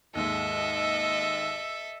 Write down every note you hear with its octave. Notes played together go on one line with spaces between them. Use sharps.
D#2 G#2 G#3 A4 D#5 E5